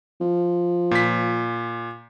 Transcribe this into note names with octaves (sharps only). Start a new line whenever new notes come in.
F3
A#2 B6